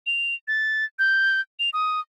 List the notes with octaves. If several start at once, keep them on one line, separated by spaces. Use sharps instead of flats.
F7
A6
G6
F7
D#6